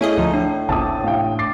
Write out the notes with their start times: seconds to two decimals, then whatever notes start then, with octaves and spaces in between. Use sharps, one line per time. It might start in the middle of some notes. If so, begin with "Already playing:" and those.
0.01 A3 C#4 E4 G#4 D#5
0.17 D2 F3 D#4
0.34 A2 D4
0.69 G1 C#2 C3 A5 D6 D#6
1.04 A1 F5 G5
1.39 D6 A6 C7